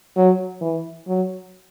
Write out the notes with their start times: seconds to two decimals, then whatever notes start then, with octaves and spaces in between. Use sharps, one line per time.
0.17 F#3
0.61 E3
1.08 F#3